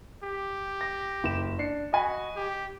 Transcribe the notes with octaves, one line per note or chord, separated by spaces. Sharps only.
G4
D6 A#6
F#1 E7
D4 C7 C#7
F#4 D#5 G#5 B5
G4